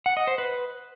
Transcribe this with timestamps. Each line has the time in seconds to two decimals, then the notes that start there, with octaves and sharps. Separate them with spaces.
0.06 F#5
0.17 D#5
0.27 C5
0.38 B4